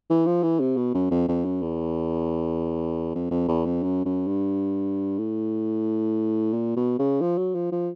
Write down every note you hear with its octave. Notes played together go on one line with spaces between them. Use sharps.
E3
F3
E3
C3
B2
F#2
F2
F2
F#2
E2
F2
F2
E2
F2
F#2
F#2
G2
A2
A#2
B2
C#3
F3
F#3
F3
F3